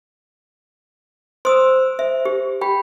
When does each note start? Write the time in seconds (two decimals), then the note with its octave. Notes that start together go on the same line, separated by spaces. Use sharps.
1.45 C5 C6 D#6 E6
1.99 C5 E5
2.25 G4
2.61 G4 G5 B5